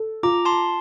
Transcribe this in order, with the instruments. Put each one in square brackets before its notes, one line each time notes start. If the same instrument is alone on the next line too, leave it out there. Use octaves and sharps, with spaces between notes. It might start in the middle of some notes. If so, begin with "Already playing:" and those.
Already playing: [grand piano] A4
[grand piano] F4 [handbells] A#5 D6
[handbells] A5 C6